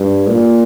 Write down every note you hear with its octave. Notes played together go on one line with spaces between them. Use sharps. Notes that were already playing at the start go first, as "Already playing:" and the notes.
Already playing: G2
A#2